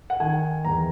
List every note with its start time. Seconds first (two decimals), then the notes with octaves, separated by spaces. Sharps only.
0.10 F#5
0.20 D#3 G#5
0.65 E2 A#5